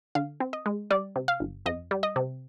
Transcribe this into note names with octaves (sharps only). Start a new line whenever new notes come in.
D3 F5
C4
D#5
G#3
G3 D5
C3
F5
G1
F2 D#5
G3
D#5
C3